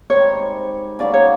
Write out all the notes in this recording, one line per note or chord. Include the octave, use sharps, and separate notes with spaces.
G#2 D#3 G3 C4 C#5
C#3 F#3 A#3 D#4 D5
C#5